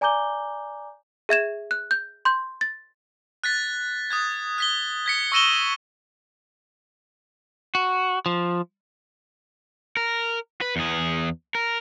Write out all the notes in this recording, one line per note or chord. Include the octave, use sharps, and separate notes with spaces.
D5 G#5 A#5 D6 G6 G7
G#4 E5 G#6 E7
F#6
G6
C6 G6
A6
F#6 A6 B6
D#6 F#6 G#6
F#6 B6 G7
G#6 B6 C#7
C#6 E6 A#6 D#7 E7 G7
F#4
F3
A#4
B4
E2 G#4
A#4